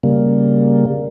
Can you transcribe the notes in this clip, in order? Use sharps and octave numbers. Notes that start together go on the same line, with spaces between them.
C#3 G3 A#3